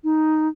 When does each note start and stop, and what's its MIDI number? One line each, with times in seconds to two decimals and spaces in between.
0.04 0.48 63